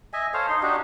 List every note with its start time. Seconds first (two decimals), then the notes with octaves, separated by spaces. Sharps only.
0.13 D#5 E5 G#5
0.34 A4 C5 C#5 F5
0.49 D#4 C6
0.63 D4 D#4 F#4 G4